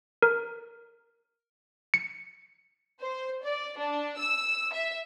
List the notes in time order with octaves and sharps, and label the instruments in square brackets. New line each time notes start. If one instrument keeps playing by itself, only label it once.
[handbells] A#4
C#7
[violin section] C5
D5
D4
E6
E5